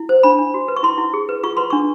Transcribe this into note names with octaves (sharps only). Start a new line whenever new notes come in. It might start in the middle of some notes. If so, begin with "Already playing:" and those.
Already playing: E4
C5
D4 B5
D4
F#4
B4
C#6
E4 C6
E4
G#4
B4
F4 C#6
B4 C6
D4 C#6